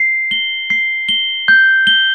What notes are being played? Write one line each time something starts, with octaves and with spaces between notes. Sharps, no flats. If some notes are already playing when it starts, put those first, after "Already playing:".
Already playing: C7
G7
C7
G7
G6
G7